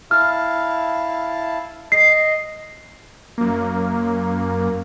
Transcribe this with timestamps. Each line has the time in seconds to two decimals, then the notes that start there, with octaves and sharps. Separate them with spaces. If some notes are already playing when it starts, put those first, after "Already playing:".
0.11 E4 F5 A5 F6
1.92 D#5 C7
3.38 F#2 A#3